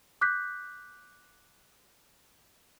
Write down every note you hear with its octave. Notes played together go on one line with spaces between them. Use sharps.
D6 F#6 G6 B6